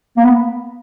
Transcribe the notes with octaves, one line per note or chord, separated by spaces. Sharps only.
A#3
B3